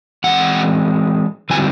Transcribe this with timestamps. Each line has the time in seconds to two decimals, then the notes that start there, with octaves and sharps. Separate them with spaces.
0.24 E3 G#3 C4 F#5
1.50 D3 G3 C4 E4 G#5